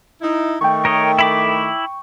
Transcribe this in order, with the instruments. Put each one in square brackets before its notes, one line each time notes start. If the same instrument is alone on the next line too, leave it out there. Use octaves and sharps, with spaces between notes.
[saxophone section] D#4 E4
[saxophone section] D#3 A3 [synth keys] G5 C#6
[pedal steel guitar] A#4 C#5 D#5
E4 B5 D6